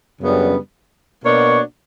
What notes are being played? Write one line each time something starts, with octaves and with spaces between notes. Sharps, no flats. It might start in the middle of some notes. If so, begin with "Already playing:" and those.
F#2 C#3 G3 B3 D4
B2 A#3 D4 F#4 C#5